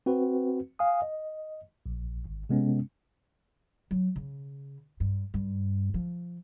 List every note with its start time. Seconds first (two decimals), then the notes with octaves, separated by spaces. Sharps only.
0.06 C4 F#4 B4
0.79 F5 G#5 D#6
1.02 D#5
1.86 A#1
2.26 G#1
2.49 C3 G#3 B3 C#4
3.91 F#3
4.16 C#3
5.00 G2
5.34 G2
5.94 F3